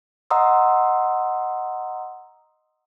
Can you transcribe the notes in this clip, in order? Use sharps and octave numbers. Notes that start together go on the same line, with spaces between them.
D#5 F#5 A#5 C6 D#6 E6